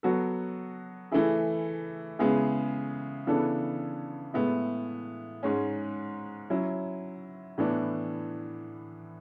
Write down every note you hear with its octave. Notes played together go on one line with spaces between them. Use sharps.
F#3 B3 F#4 A4
E3 A3 E4 G#4
C#3 G#3 B3 E4 G#4
C#3 E3 B3 D4 A4
A2 G#3 B3 E4
G#2 G#3 C#4
F#3 C#4 E4
A2 E3 B3 D4